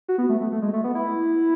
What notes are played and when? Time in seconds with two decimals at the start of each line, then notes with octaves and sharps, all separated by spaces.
0.09 F#4
0.18 B3
0.29 A3
0.41 A3
0.52 A3
0.62 G#3
0.73 A3
0.84 B3
0.95 E4